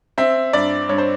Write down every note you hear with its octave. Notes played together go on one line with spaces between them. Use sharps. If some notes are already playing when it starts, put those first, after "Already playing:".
C4 E5
G2 D5
G2 C#5
C5